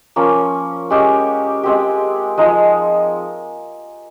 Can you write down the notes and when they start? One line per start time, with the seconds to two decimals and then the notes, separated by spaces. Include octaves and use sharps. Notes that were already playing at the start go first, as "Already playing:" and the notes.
0.16 F3 A#3 C#4
0.90 G#3 C#4 G4
1.63 G#3 C4 G4
2.38 F3 G#3 D#4